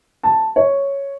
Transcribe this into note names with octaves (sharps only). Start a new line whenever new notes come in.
A5
C#5